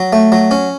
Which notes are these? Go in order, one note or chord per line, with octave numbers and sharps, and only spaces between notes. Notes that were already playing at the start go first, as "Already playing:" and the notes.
Already playing: F#3
A3
F#3
C#4